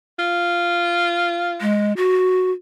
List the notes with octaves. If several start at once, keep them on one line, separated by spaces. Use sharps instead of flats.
F4
G#3
F#4